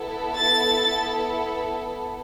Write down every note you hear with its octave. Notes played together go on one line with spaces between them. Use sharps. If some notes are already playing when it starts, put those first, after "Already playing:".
Already playing: B3 E4 A4
A6